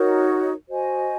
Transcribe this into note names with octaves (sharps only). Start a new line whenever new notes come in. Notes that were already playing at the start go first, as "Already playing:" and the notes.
Already playing: D#4 F#4 A#4 C#5
F#4 C5 D#5 G#5